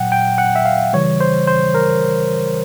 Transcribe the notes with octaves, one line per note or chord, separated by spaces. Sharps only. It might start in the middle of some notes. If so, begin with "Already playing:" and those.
Already playing: A#2 F#3 F#5 G5
G5
F#5
E5
F5
C#3 E3 G3 C#5
C5
C5
A#4